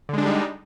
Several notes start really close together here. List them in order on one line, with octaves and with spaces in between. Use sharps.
D3 G#3 D4 G3 D#4